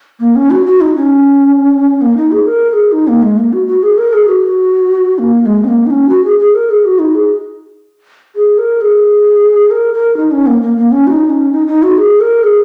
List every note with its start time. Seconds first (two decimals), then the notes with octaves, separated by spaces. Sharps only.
0.20 A#3
0.36 C#4
0.51 F#4
0.66 F#4
0.81 D#4
0.96 C#4
2.01 A#3
2.17 D#4
2.32 G#4
2.47 A#4
2.70 A#4
2.73 G#4
2.92 D#4
3.08 A#3
3.23 G#3
3.38 A#3
3.53 F#4
3.67 F#4
3.83 G#4
3.98 A#4
4.13 G#4
4.28 F#4
5.19 A#3
5.41 A#3
5.46 G#3
5.64 C#4
5.68 A#3
5.86 D#4
5.91 C#4
6.09 F#4
6.24 G#4
6.39 G#4
6.54 A#4
6.70 G#4
6.85 F#4
6.99 D#4
7.15 G#4
8.35 G#4
8.58 A#4
8.81 G#4
9.71 A#4
9.94 A#4
10.17 D#4
10.31 C#4
10.47 A#3
10.62 A#3
10.77 A#3
10.92 C#4
11.07 F#4
11.11 D#4
11.30 C#4
11.53 D#4
11.67 D#4
11.83 F#4
11.98 G#4
12.20 A#4
12.43 G#4